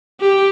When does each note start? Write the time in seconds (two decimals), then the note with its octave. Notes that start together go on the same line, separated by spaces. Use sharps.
0.21 G4